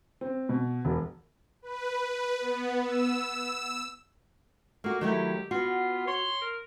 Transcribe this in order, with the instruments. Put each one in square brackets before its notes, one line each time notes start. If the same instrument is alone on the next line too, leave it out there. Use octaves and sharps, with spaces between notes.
[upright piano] C4
B2
E1
[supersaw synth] B4
B3
E6
[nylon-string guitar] A3 F#4 [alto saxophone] A#3
[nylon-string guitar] D#3 F#3 A3 [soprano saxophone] E4 [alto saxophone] G4
[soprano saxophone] B3 [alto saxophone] F4 [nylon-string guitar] F#4
[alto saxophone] C#5 [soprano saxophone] C6
[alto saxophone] A#4